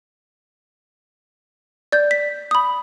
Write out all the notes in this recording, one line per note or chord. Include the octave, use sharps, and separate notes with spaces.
D5 G6
B6
B5 D#6